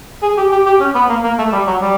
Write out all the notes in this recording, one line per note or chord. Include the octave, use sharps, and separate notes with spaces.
G#4
G4
G4
G4
C#4
B3
A#3
A#3
A3
G3
F#3
G3